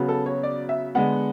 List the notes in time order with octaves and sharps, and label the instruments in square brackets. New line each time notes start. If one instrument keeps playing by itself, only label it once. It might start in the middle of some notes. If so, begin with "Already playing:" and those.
Already playing: [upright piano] C#3 F#3 B3
A4
C#5
D5
E5
D3 G#3 B3 F#5